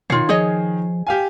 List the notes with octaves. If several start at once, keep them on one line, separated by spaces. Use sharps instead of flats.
B2 D#3 F4 C#5 C7
F3 G#4 C#5 D#5
G4 F5 G#5